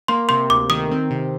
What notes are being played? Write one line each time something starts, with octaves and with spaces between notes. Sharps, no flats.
A#3 C6
C3 C6
D2 D6
D#3 D#6
C4
C3